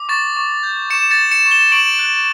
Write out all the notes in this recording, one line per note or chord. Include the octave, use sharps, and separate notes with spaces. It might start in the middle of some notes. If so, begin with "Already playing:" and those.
Already playing: D6
C#6 A6
C#6
G6
C#6 C#7 E7
A6 C#7
C#6
C#7 E7
C#6
E7 G7
C#6 D7 F#7
F#6